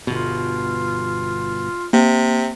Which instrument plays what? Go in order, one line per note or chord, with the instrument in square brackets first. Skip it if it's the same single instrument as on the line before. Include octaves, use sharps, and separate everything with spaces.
[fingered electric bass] G1 B2 [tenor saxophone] F4
[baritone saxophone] C3 [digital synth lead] A#3